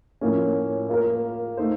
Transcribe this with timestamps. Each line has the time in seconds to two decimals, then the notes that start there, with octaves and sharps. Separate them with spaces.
0.21 A2 F3 A#3 C#4
0.89 A#3 F4 A#4
1.57 A3 D#4 A4 C5